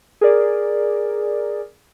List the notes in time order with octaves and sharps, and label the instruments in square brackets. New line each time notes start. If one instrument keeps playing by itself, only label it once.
[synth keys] G#4 A#4 D5